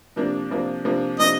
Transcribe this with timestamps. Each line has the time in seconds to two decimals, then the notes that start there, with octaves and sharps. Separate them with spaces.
0.16 C3 F3 A#3 D4
0.50 C3 F3 A#3 D4
0.85 C3 F3 A#3 D4
1.19 C3 F3 A#3 D4 D#5